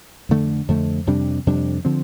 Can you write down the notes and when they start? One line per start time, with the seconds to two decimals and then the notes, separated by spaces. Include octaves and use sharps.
0.29 F2 D3 A3
0.68 F2 D3 A3
1.07 F2 C3 G3 D4
1.47 F2 C3 G3 D4
1.85 D3 F3 C4